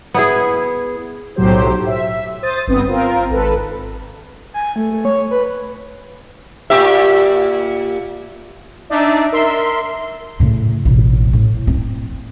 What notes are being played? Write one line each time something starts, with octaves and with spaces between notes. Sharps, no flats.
B3 E4 G#4
B1 A2 F#3 G4 C5
E5
C5 D#6 A6 D#7
G1 B3 C4 D#6
C4 F4 A#4
G#1 A4 B4
G#5
A3
A3
C#5
B4
A#2 G4 E5
D4 D#4 D5 E5
A#4 E5 C6
A2 C#3
A1 B2
A2
C4